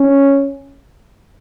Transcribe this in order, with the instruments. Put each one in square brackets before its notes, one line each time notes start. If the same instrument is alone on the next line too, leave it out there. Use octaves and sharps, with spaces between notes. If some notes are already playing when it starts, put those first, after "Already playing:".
Already playing: [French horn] C#4